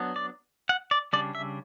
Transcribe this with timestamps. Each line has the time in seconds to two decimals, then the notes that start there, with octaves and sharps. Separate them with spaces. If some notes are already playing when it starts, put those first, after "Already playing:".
Already playing: F#3 B3 D4
0.16 D5
0.69 F#5
0.91 D5
1.13 C#3 G3 D4 D5
1.35 E5